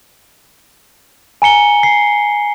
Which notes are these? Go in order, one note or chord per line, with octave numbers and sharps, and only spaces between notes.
G#5 A#5 C#7 G7
C7